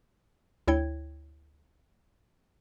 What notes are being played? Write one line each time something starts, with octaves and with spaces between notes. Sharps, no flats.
D2 E4 C#5 G5 G#6